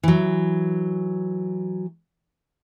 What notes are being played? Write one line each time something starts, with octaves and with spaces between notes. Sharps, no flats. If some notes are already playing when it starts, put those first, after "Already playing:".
E3 F#3